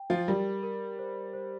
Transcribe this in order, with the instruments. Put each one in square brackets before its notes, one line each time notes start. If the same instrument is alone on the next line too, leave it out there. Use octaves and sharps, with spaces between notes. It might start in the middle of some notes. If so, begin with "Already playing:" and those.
Already playing: [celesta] G5
[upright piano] F3 F4
[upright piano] G3 [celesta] A#4
[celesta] A#4
C5
C5